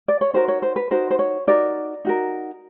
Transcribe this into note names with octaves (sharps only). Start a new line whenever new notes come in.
D5
C#5
D#4 F#4 A#4 C5
C#5
C5
B4
D#4 F#4 A#4 C5
C5
C#5
D#4 F#4 A#4 D5
D#4 F#4 A#4